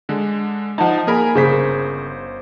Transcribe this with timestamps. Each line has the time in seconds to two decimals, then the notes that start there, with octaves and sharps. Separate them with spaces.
0.09 D3 G#3
0.78 F3 D#4 D#5 F#5 A5
1.07 A#3 G#4 A#4 G#5 B5
1.35 G1 C#3 G#4 A#4 C5 B6